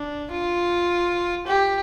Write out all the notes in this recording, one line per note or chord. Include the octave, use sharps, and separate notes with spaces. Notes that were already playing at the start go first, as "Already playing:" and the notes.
Already playing: D4
F4
G4